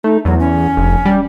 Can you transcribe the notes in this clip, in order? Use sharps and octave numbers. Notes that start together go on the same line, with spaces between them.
A3 D#4
E2 F#3
C#4
F1
G3